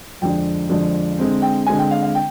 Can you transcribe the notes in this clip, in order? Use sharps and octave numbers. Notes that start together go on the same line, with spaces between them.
F2 D3 F3 G#3 D4 G5
F2 D3 F3 G#3 D4
D3 G#3 C4
G5
D3 G#3 C4 G#5
G5
F5
F5
G5